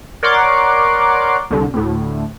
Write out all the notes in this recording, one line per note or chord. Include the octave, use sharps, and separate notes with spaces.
A#4 C#5 D5 F#5 C6 D6
C2 D3
D2 A2